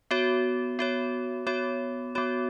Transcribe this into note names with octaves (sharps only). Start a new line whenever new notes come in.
B3 F#4 C#5
B3 F#4 C#5
B3 F#4 C#5
B3 F#4 C#5